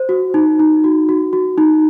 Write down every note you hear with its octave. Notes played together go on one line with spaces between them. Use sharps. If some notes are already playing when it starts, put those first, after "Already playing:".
Already playing: C5
F#4
D#4
D#4
F#4
F#4
F#4
D#4